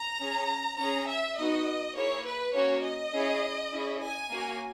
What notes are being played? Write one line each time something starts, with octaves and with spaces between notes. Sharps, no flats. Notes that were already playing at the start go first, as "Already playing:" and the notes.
Already playing: A#5
C#4 G#4
C#4 G#4 A#5
E5
B3 D#4 F#4 D#5
A#3 E4 G#4 C#5
B4
A#3 C#4 F#4 C#5
D#5
C#4 E4 G#4
C#4 E4 G#4
G#5
A#3 C#4 F#4